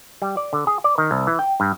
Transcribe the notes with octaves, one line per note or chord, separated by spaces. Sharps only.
G3
D5
D3
G#4
D5
D#3
C2
E3
G5
G2